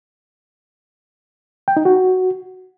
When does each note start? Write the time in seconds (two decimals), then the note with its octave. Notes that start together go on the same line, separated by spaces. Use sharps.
1.68 G5
1.77 D#4
1.85 F#4